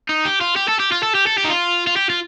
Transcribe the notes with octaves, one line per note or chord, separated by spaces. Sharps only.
D#4
G4
F4
G4
A4
G4
F4
A4
G4
A4
G4
D#4
F4
F4
G4
F4